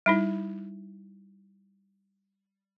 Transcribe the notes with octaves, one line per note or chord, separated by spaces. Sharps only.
G3 D#4 E4